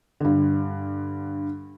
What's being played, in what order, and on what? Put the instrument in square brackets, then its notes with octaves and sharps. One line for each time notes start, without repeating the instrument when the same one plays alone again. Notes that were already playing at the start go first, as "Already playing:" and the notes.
[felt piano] G2 D3